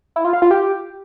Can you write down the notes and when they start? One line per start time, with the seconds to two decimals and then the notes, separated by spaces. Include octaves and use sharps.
0.16 E4
0.25 F4
0.33 F5
0.42 F4
0.51 G4